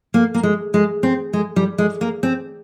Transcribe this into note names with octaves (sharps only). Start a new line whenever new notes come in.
A#3
A#3
G#3
G#3
C4
G#3
G3
G#3
A#3
C4